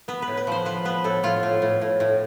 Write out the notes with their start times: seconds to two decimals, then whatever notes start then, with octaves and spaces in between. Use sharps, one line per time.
0.08 B3 B4
0.22 B4
0.28 A2
0.37 B4
0.47 F3 C5
0.65 F3 B4
0.85 B3 B4
1.04 A2 A4
1.23 A2 F4
1.43 A2
1.62 A2
1.81 A2
2.00 A2